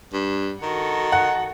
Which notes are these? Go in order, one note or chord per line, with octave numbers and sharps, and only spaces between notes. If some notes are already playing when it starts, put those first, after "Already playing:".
G2
D#3 F#4 A4
F#5